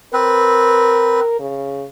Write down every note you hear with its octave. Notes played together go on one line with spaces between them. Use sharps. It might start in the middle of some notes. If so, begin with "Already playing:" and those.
C4 A#4 B4
C#3